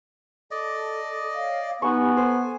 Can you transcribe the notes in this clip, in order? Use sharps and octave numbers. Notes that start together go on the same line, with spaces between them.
A4 D5 D#5
C#5 F5
B3 D#4 G4 G#5 B5 C#6
A4 C5 G#5